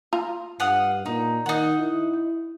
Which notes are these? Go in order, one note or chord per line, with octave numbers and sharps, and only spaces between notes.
F4 A#5
G2 F5 F#5 D#6
A#2 D#4
D#3 D#4 F#5
E4